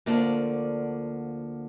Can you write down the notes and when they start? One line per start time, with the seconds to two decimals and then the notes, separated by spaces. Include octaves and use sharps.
0.06 D2 D3 F3 A#3 D5